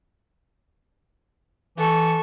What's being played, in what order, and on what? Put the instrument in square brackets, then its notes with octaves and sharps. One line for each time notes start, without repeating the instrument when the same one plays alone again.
[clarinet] E3 [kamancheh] A4 C#6